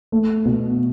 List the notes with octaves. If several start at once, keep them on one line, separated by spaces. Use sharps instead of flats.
A3
B2